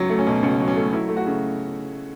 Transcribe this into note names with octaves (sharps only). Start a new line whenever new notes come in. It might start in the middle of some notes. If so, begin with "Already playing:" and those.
Already playing: C#2 F#3
A3
C#4
B2
C#2 C#4
F#3
C#4
A3
F#3 E4
A3
F#4
C#3